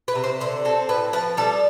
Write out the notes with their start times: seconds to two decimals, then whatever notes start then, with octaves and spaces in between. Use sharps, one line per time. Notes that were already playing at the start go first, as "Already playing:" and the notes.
0.08 B4
0.15 C3
0.24 C5
0.40 D3 C5
0.65 C4 A4
0.89 A2 B4
1.13 F3 B4
1.37 G3 A4